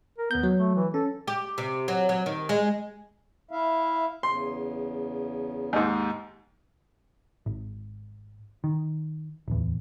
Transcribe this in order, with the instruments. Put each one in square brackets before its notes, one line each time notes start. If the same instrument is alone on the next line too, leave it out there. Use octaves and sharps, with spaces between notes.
[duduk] A#4
[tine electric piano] D#2 G6 [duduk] B3
[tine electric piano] F#3
[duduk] A3
E3
[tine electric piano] C#4 [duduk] A4
[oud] G4
C3
F#3
F#3
D#3
G#3
[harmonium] E4 E5 F5
[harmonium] E2 C#3 [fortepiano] C6
[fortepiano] D#2 G#2
[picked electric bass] G#1
D#3
D1 E2